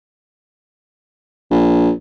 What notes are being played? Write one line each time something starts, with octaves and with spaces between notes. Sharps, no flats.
A#1